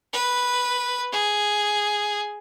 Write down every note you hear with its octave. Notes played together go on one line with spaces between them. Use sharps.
B4
G#4